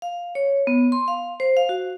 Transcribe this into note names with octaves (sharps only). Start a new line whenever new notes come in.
F5
C#5
B3
C6
F5
C5
F5
F#4